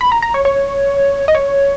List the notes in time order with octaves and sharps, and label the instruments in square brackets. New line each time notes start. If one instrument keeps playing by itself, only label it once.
[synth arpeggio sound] B5
A#5
A#5
C#5
C#5
D#5
C#5